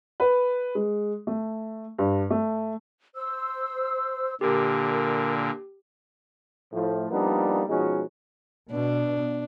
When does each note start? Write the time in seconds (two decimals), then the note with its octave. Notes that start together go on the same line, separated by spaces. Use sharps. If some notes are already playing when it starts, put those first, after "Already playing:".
0.20 B4
0.75 G#3
1.27 A3
1.99 G2
2.30 A3
3.15 C5 E6
4.41 A#2 D3 G4 A#4
6.72 A2 F3
7.10 F3 G3 A#3 B3 D4 D#4
7.68 B2 F3 G#3 C#4 D#4 F#4
8.71 B2 D4